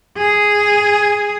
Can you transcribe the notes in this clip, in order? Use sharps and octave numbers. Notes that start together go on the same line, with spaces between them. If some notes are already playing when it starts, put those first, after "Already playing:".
G#4